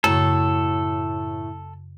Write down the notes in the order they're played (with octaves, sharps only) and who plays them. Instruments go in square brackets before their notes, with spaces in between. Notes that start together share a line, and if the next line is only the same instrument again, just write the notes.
[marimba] F#2 C#3 [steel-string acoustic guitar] A2 C#5 [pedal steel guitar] A4